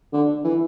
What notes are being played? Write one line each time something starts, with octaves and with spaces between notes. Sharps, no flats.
D3
E3